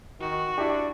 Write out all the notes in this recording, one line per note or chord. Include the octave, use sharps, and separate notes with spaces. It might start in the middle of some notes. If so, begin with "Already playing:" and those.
D#3 F#4
D4 E4 G4